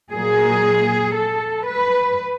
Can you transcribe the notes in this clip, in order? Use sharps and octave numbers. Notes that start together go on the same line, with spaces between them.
A#2 F#3 A#3 G#4
A4
B4